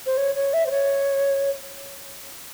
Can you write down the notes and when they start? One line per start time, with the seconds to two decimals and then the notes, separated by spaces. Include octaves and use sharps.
0.06 C5
0.17 C#5
0.36 C#5
0.53 E5
0.66 C5
0.71 C#5